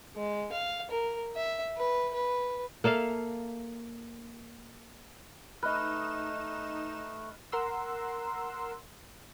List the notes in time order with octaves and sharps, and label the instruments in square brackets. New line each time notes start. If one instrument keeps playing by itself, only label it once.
[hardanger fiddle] G#3
F5
A#4
E5
B4
B4
[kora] A#3 A4 E5 F5
[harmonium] A3 [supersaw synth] D#4 E7 [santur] B4 D#5 [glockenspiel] F6 F#6
[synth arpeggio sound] A#4 F#5 C6 E6